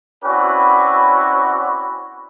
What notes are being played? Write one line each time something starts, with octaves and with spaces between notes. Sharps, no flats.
C4 C#4 E4 F#4 B4 D5